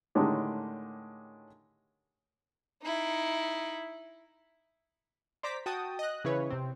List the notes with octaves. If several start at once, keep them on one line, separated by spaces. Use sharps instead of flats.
A2 D3 D#3 G#3 C#4 G4
D#4 E4
C5 D5 A#5 D6 B6
F#4 G5 A5 D#6
D#5 F#6
C#3 E3 E4 B4 C#5
C3 C4